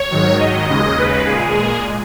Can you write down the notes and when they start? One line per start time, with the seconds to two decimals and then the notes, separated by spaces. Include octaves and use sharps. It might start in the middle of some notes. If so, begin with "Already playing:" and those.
Already playing: C#5
0.11 G#2 D#3 F#3
0.39 D#5
0.68 D#2 C#3 G#3 D#5
0.98 B4
1.27 A#2 G#3 G#4